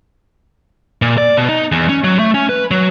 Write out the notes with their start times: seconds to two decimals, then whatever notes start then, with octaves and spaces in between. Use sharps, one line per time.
1.02 A#2
1.18 D5
1.37 B2
1.49 D#4
1.72 E2
1.89 C#4
2.04 F#3
2.19 A3
2.34 C#4
2.49 B4
2.71 F#3